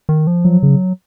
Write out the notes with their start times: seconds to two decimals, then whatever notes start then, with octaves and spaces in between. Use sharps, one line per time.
0.09 D#3
0.27 F3
0.44 F3 F#3
0.63 C#3